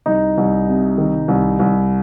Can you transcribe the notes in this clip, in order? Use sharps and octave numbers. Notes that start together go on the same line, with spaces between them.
C2 D#4
C2
C3
D#3
C2
C2